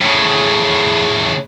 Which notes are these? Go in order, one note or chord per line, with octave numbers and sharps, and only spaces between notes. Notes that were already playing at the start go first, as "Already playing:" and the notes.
A2 C#3